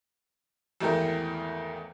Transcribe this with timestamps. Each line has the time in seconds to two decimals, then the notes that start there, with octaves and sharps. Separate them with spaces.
0.80 G#1 E2 A3 G4 A#4 G6